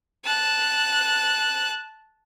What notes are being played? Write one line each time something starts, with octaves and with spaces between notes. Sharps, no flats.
A5 F#6